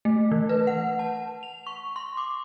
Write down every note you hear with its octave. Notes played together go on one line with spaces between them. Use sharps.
A3
E3
B4
F#5
A5
F7
C#6
C6
D6